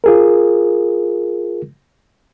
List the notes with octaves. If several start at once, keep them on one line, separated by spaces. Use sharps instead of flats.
F4 G#4 A#4